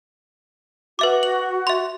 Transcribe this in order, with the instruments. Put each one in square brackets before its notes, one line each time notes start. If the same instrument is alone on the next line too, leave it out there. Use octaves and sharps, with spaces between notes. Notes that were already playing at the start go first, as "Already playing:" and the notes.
[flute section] F#4 [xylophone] B4 E5 D6
[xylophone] F#7
E5 C6